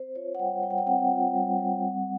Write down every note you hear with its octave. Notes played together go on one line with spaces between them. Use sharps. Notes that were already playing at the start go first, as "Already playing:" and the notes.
Already playing: C4 C5
F4 C#5
F#5
G3 G5
G3 G5
F#5
G5
C4 F#5
F4
G3
G3
C4